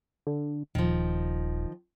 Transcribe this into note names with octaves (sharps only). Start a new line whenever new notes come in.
D3
D#1 D#3 F3